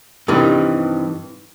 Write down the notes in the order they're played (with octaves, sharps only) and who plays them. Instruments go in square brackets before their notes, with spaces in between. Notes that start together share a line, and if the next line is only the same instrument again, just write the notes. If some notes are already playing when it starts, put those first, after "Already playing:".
[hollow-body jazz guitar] G2 C3 D#3 E3